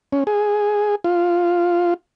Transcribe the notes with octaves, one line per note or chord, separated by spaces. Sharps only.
C#4
G#4
F4